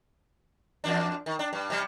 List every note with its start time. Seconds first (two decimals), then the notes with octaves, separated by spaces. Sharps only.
0.84 E2 D4
1.26 D#3
1.39 D4
1.53 G2
1.70 C3 G3